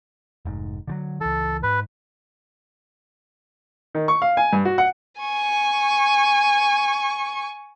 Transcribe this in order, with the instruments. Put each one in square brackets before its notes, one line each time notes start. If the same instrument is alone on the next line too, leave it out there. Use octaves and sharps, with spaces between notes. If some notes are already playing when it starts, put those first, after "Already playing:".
[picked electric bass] F1 G#2
D3 F3 F#3
[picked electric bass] C#2 E3 [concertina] A4
[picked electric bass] G#2 [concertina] B4
[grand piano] D#3
C#6
F5
G#5
G2
F#4
F#5
[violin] G#5 C#6